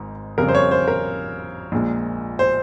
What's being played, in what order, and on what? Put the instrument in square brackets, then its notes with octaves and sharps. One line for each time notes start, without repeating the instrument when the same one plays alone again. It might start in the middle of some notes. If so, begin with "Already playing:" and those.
Already playing: [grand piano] G#1 G#2
F2 C#3 G3 A#4
C5
C#5
C5
A#4
A#1 A#2 G#3
C5